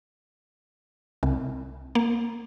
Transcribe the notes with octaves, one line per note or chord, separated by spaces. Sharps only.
C2
A#3